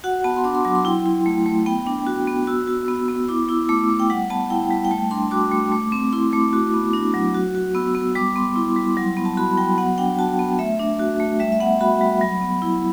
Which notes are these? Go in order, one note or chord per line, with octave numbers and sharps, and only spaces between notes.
F#4 F#5
B3 A5
C6
D4 D6
C6
F#3 D6
C6
E4 G5
E4
A3
A3
B3 G5
D4
F#4
B3
F#4 E6
F#4
B3
B3
E4 D6
E4 E6
A3 D6
A3
G5
G3 F#5
B3 A5
E4 G5
G3
G5
A3 A5
D4 C6
F#4 D6
A3
A3
C4
E4 C6
A3 D6
F#4
B3
D4
F#3
F#4
F#4
B3 E6
B3
G3 D6
B3 C6
E4
G3
F#3
B3
A5
F#4 B5
F#3 G5
B3 F#5
D4 G5
F#4 A5
B3
A3 E5
D4
F#4
A3
G3 E5
E5
B3 F#5
F#4 B5
G3
F#3
B3
E4